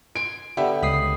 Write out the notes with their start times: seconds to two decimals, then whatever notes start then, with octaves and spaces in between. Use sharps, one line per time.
0.15 G#5 C6 D7
0.57 D3 B3 G4 E5
0.82 C#2 B5 D#6 C7